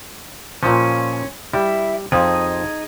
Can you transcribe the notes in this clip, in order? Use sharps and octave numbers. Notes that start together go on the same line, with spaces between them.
A#2 F3 C#4
G3 E4
F2 F3 D#4 G#4